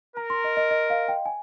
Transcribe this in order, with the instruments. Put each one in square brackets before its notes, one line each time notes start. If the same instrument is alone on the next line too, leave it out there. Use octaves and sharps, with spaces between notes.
[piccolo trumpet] A#4 [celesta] A#5
[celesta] C6
D#5
D#5
D#5
F5
G5
G#5